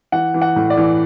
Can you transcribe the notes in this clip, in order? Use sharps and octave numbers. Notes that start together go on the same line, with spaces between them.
E3 F#5
E3
F#5
A2
D5
E3